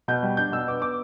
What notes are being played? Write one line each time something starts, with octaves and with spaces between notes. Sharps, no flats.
B2 G6
G3
D4 G6
B2 E6
B3 D6
B3 D6